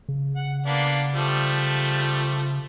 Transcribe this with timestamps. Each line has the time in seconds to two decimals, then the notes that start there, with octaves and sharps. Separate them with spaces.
0.09 C#3
0.36 F#5
0.66 A#3 B3 D4
1.15 F3 G3 A3